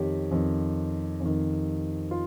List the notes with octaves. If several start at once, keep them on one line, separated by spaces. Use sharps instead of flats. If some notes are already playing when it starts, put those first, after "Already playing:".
Already playing: F2 D#3 G4 C#5
F2 D#3
F2
D#3
F4